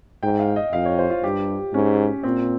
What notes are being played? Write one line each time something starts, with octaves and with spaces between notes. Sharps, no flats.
G#2 G5
F5
D#5
F2 F5
C#5
C5
F4
G2 G4
G#2 C#4
A#2 C4